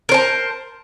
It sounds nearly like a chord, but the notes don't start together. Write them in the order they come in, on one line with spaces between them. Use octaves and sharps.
A#4 C5 A5